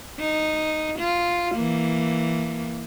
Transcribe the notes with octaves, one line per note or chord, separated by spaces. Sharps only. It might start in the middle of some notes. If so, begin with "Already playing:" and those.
D#4
F4
E3 A#3